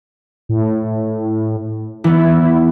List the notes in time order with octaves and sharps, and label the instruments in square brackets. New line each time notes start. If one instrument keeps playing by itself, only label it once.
[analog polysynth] A2
[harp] E3 B3 [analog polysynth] E4